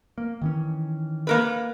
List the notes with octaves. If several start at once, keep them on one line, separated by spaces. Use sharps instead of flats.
A#3
D#3 E3 C#4
A#3 A#4 B4